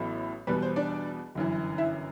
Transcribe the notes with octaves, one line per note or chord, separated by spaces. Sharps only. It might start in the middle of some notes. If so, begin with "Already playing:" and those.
Already playing: A1 A2 F#3 B3
E2 B2 G3 B3 B4
C5
D4 D5
G1 F#2 E3
E4 E5